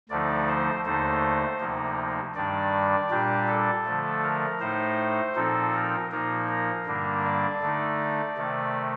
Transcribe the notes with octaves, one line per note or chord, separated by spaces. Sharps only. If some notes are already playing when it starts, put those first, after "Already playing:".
D2 D3 F3 A3 D#4 D5
C5
D#2 D3 A3 D#4 C5
D2 C3 F3 A#3 D#4
G2 D#3 G3 D4 D5
A#2 G3 D4 G4
A4
D3 F3 A3
A#4
A2 A3 D#4 C5
A#2 F3 C4 D#4 A4
A#4
A#2 F3 A#3 D#4 A#4
A#4
G2 D3 G3 A#3 D4
D5
D3 A3 D#4
C3 D#3 A3